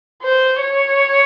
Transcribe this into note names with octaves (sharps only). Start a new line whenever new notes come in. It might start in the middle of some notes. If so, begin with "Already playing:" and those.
C5
C#5